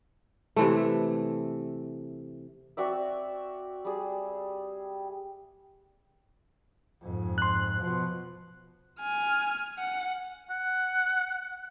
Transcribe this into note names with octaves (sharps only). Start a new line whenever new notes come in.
C3 E3 A3
C4 F#4 D5 E5
G3 G#4
F2 G#2
C6 F#6
B2 F3
G#5 F6
F#5
F#5